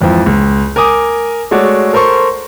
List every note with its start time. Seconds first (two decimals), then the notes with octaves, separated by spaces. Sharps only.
0.01 G#1 F2 E3 F3
0.26 C#2
0.76 A#4 G#5 D6 D#6
1.51 G#3 A3 F#4 C#5 D5
1.93 A4 A#4 C5 C6 C#6